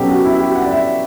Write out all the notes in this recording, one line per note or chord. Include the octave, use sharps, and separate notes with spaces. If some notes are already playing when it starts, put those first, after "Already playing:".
Already playing: B2 F#3 C#4 G4 A4
F#4
E4
G4
F#5
D5
E5